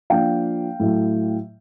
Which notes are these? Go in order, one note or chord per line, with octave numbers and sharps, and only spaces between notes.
F3 A#3 D4 F5 G5
A2 F#3 A3